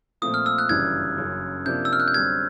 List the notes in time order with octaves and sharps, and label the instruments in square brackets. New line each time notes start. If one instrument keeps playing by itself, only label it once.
[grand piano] A#2 F3 A3 C4 F4 [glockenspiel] D#6
[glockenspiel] F6
E6
F#6
[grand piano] G1 F#2 C#3 E3 G3 [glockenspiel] G#6
[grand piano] F#1 F#2 C#3
[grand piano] C3 F3 A#3 D4 [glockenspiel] G6
[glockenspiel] E6
F6
F#6
G6
[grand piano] F#2 D3 G3 C4 [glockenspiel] G#6